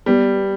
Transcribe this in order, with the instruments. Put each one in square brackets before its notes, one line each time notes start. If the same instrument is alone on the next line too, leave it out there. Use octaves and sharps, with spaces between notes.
[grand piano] G3 [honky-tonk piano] B3